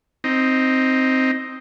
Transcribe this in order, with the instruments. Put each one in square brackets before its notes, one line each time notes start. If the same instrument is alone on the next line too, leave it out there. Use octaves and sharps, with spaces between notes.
[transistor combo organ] C4 D#4